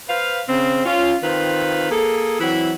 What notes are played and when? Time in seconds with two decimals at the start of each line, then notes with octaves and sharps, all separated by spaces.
0.08 B4 C5 F5
0.49 C#3 C4
0.85 C#4 F4
1.23 D#3 C4 F4 B4
1.91 A#3 G#4 A4
2.40 E3 F#3 C4 E4